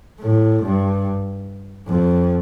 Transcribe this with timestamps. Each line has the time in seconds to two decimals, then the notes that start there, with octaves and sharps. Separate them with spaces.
0.21 A2
0.62 G2
1.87 F2